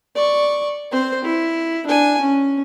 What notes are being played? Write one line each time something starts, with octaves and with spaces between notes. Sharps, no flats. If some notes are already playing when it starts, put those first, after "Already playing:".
D5 C#6
C4 C5
E4
D4 G#5
C#4